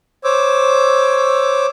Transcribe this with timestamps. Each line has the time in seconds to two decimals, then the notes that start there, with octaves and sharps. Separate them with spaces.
0.24 C5 C#5 D6 E6